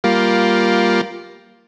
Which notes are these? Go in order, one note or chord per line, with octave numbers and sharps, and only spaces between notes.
G3 A#3 F4